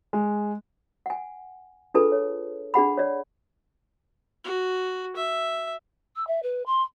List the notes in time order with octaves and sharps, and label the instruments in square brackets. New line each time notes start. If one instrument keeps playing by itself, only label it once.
[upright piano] G#3
[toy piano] F#5 G#5
D4 F4 G#4 A4 B4 A5
C#5
D4 G#4 F#5 B5
C#5 D5
[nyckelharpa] F#4
E5
[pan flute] E6
E5
B4
C6